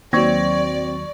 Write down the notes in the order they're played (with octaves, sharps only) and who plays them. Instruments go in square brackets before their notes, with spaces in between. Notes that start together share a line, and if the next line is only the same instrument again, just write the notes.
[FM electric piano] D#2 F#3 [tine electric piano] C4 [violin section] D5 [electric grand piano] C#6 G#6 A#6